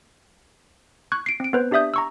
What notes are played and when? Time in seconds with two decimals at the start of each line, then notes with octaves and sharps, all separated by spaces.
1.12 C#6 F#6 G#6
1.26 C7 D7
1.40 C4 D7
1.53 B3 B4 C5
1.71 D4 G4 D5 E5 D#6 G6
1.94 A#5 C#6 E6